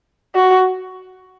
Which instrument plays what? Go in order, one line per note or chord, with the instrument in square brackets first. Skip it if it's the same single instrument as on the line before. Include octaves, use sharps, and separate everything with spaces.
[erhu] F#4